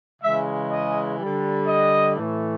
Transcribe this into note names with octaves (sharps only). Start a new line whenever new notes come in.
C#3 E3 G#3 E5
D#5
D3 G3
D#5
A2 E3 A3